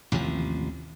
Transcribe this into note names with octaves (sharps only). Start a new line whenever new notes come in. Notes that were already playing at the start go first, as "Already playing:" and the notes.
A1 D#2 C3 F3